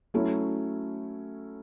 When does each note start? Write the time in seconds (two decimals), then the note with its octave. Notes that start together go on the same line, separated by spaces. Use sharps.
0.14 F#3 A3 C#4 E4